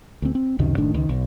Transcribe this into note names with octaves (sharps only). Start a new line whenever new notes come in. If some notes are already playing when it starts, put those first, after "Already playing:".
D2 C4
C4
C#2 F#2 C3 D#3
F#1 A2 D#3 D4
C#2 D#3
B1